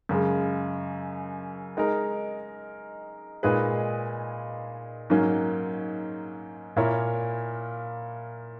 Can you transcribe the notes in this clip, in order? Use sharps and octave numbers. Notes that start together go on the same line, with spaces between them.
F#2 C#3 G#3
G#3 D#4 A#4
A#2 G#3 D#4 G#4 B4
G#2 F#3 A#3 C#4
A#2 A#3 E4 A#4 C#5